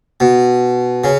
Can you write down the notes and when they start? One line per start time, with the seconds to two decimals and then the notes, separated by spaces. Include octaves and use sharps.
0.20 B2
1.04 C#3